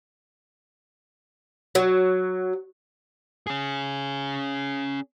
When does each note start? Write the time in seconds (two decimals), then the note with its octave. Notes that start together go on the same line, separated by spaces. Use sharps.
1.75 F#3
3.47 C#4 G#4